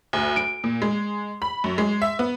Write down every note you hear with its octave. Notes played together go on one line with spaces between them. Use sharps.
D2
D7
A#2
G#3
B5
F#2
G#3
E5
B3